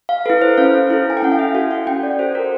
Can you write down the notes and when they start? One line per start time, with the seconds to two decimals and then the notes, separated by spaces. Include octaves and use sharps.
0.09 F5
0.26 E4 A4 B4
0.42 C5
0.58 C#4 F5
0.90 E4 A4
1.10 G#5
1.17 G5
1.22 C#4 F#5
1.32 F5
1.39 E5
1.55 F#4 A4 F5
1.71 F#5
1.87 C#4 G5
2.03 D5
2.19 F#4 A4 C5
2.35 A#4